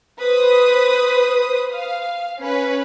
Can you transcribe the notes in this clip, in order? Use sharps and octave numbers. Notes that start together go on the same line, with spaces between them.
B4 C5 D#6
F5
C#4 B4